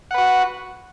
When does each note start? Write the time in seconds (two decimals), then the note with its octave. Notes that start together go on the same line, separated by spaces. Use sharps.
0.11 F#5
0.14 B4
0.18 F#4